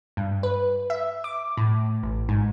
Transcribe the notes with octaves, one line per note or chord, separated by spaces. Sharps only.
G2
B4
E5
D6
A2
A1
G#2